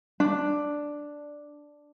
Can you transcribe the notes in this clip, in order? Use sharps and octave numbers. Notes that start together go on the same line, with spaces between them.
D4